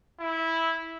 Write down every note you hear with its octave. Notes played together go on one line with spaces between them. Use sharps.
E4